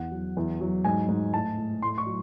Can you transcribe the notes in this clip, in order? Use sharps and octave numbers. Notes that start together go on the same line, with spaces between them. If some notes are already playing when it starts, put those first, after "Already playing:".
Already playing: E2 F#5
F#3
E2
F#3
G#2 G#5
G#2
A2 A5
A2
A2 C6
C#6
F#3